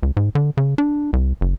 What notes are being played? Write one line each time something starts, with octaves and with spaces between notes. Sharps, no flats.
C#2
G#2
D3
C#3
D4
C2
F#1